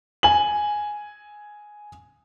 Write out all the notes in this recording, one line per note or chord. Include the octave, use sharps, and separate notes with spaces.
G#5 F#7